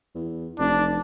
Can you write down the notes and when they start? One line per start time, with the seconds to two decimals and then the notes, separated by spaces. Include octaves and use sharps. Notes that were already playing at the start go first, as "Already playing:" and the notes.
0.15 E2
0.59 F1 D4